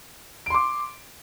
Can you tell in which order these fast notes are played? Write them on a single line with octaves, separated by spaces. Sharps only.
D7 C6 D6